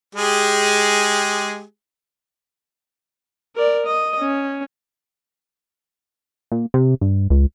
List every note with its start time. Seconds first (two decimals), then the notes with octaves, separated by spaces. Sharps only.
0.15 G#3 G4 G#4
3.56 A#4 D5
3.86 D#5
4.20 C#4
6.52 A#2
6.74 C3
7.01 G2
7.30 C#2